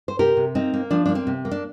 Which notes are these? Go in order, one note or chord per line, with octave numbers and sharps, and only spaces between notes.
C5
C3 G4 A#4
C3
A#3 C4 D#4
A#3
F3 D4
A#3 D4
C4
C3
A#3
D4